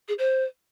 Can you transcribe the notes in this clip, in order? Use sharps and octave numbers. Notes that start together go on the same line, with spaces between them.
G#4
C5